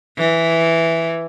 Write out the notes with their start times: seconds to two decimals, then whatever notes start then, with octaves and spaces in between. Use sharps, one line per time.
0.17 E3